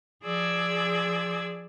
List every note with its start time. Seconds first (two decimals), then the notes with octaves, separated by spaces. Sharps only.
0.23 F3 G#4 D5 E6 G#6